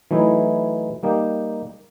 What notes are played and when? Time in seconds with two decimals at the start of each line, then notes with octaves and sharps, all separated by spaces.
0.11 E3 F#3 A3 D#4 E4
1.03 G3 A#3 D#4 G4